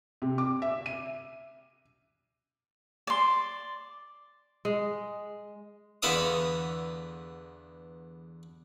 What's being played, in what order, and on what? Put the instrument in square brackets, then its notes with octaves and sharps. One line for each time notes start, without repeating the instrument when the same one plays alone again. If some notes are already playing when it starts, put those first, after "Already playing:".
[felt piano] C3
D6
E5
D#7
[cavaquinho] D5 C6
[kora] G#3
[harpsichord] E2 D3 B3 E5 F5 D#6